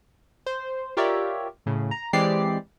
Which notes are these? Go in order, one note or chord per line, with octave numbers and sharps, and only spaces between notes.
C5
F4 G4 A#4 C#5 D5 E5
A2 C#3
A#5
E3 G#3 C4 G4 D5 C7